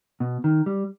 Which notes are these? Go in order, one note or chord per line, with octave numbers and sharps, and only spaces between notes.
B2
D#3
G3